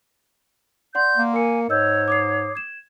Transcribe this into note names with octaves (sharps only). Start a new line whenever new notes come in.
D5 F#5 C6 G6
A#3
A#4 G#5 C#7
G#2 C#5 D#5 E6 G6
D6 D#6 C7
G#6 E7